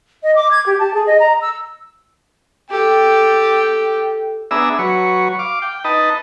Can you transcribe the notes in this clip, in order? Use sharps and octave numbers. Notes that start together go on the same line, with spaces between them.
D#5
D6
G#6
G4
A5
G#4
D#5
A#5
E6
G4 A4 G5
B3 D4 G#4 E5 A#5 E6
F#3 B4 C#5
F5 D6
G5
D#4 B4 D#5 A5